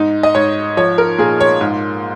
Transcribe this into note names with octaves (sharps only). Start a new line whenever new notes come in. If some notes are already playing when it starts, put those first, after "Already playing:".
Already playing: G#2 D#4
D#5
G#2 C#5
F3 C#5
A#4
A#2 G#4
C#5
G#2